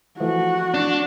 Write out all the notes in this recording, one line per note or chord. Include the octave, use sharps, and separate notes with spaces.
E3 F3 A3 F#4
D4